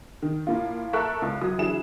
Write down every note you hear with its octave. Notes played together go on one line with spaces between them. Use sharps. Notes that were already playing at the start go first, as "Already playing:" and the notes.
D#3
A2 A#3 F4
A4 A#4 E5 C#6 F#6
C#2
F#2 F#3 D#6
D2 E3 F#3 E4 G#4 E7